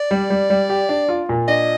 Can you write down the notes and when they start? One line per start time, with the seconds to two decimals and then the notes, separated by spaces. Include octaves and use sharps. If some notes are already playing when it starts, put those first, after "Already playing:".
Already playing: D5
0.11 G3
0.30 G3
0.50 G3
0.70 G4
0.89 D4
1.09 F4
1.29 A#2
1.48 D4 D#5